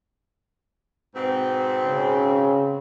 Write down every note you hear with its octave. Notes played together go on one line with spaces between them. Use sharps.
G#2 B2 C4
C#3